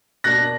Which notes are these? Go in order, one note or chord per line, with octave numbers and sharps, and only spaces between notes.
B2 A#3 D4 F#6 A#6